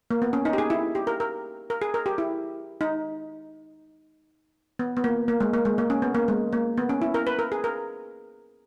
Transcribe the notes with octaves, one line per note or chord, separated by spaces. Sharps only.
A#3
B3
C#4
D#4
G4
G#4
E4
G4
A#4
A#4
A#4
G#4
A#4
G4
E4
D#4
B3
B3
A#3
A#3
G#3
A#3
G#3
A#3
C#4
B3
A#3
G#3
A#3
B3
C#4
E4
A#4
B4
A#4
G#4
A#4